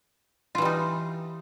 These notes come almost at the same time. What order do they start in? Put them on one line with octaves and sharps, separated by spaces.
F4 E3 G3 D#4